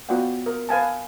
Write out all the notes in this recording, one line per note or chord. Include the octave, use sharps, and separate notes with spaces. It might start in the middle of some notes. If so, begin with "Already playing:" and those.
B3 F4 F#4 D5 F#5 G5
A#4
B4 F5 G#5 A5